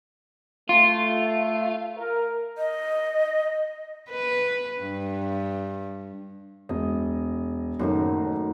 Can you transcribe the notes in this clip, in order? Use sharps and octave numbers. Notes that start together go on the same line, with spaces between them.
A3 F4
A#4
D#5
B4
G2
E1 D#5
F#1 F#2 A2 D#3 D#4